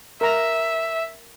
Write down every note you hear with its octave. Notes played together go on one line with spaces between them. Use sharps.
A#4 E5 A#5